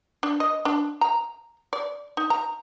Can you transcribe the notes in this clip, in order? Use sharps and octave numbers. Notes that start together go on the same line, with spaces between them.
D4
D#5
D4
A#5
D5
D#4
A#5